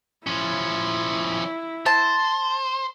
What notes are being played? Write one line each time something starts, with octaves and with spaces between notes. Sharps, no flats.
F3 C#4 E4
C5 A5